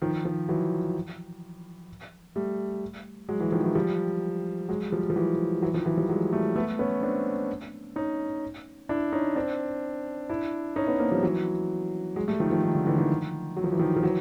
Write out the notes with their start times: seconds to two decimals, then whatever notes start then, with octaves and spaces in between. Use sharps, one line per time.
0.02 D#3 F3
0.25 D#3 F3
0.49 E3 F#3
2.36 G3 A3
3.29 F#3 G#3
3.40 E3 F#3
3.52 D#3 F3
3.63 E3 F#3
3.75 F3 G3
4.69 F#3 G#3
4.92 F3 G3
5.10 F3
5.16 E3 F#3
5.62 E3 F#3
5.74 D#3 F3
5.86 E3 F#3
5.97 F3 G3
6.09 F#3 G#3
6.32 G3 A3
6.56 A3 B3
6.79 B3 C#4
7.03 C4 D4
7.96 C#4 D#4
8.89 D4 E4
9.13 C#4 D#4
9.36 C4 D4
10.29 D4 E4
10.76 C#4 D#4
10.88 B3 C#4
10.99 A#3 C4
11.11 F3 G3
11.23 E3 F#3
12.16 F#3 G#3
12.28 G3 A3
12.40 D#3 F3
12.51 D#3 F3
12.63 D#3
12.75 D3
12.86 D3 E3
12.98 D#3 F3
13.56 F#3
13.64 F3
13.72 E3
13.79 D#3 F3
13.96 F3
14.03 E3 F#3